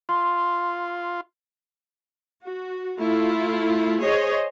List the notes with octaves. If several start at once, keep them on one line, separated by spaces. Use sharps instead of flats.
F4 C6
F#4
A3 E4 F4
G#4 C5 C#5 D#5